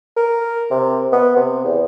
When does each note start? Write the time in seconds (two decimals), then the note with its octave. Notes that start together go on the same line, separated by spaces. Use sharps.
0.16 A#4
0.70 C3
1.12 B3
1.36 C3
1.64 E2